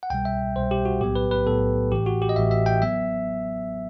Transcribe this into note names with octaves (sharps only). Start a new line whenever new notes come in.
F#5
C2 B2 G3 G5
E5
C2 B2 G3 C5
G4
F#4
B1 A2 F#3 B3 G4
B4
B4
B1 A2 F#3 B3 A4
A1 A2 E3 G4
F#4
G4
D#5
A1 A2 E3 E5
E5
G5
F#3 B3 E5